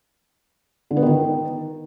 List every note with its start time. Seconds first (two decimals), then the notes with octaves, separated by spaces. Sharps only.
0.91 D3
0.97 B3
1.03 D#3